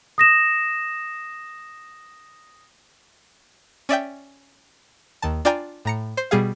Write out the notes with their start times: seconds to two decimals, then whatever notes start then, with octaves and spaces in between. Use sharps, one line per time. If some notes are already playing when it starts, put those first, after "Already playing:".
0.18 D#6 A#6 E7
3.89 C#4 D5 E5 G5
5.22 D#2 D#3 A5
5.45 D4 F4 D5 G5 G#5 A#5
5.85 A2 A#5 C#7
6.17 C5
6.31 B2 G3 G#4 F5